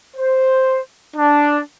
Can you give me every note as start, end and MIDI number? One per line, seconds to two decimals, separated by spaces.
0.17 0.80 72
1.16 1.60 62